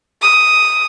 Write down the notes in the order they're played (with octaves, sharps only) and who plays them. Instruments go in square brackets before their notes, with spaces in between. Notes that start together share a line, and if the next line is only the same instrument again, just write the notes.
[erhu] D#6